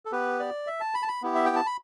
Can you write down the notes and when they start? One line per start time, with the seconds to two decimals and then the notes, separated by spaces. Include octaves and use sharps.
0.05 A4
0.12 B3 G4 B4
0.40 D5
0.67 E5
0.80 A5
0.94 B5
1.03 A5
1.08 B5
1.22 B3 E4 G4
1.35 E5
1.45 G5
1.56 A5
1.66 B5